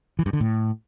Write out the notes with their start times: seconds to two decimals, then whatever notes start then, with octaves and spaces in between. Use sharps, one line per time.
0.19 E3
0.26 G2
0.33 D3
0.40 A2